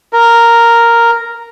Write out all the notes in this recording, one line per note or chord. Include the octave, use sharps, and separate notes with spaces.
A#4